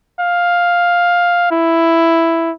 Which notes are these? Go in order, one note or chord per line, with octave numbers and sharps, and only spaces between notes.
F5
E4